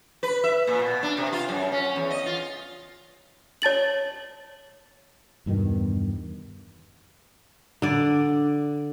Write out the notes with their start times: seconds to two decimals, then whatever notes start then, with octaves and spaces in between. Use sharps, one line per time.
0.23 B4
0.44 E5
0.67 A#2
0.80 B2
1.03 D4
1.17 C3
1.32 F4
1.49 F#2
1.72 C#4
1.96 E2
2.10 D#5
2.26 F4
3.62 C#5 A5 A6 F#7
5.46 E2 G2 B2 D#3
7.82 D3 D5